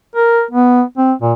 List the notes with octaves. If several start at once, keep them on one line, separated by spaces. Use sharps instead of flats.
A#4
B3
C4
A#2